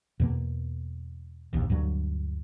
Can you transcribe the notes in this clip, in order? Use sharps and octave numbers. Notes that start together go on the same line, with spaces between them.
E2 B2 A#3
F1 A#1 D#2
D2 G2 F#3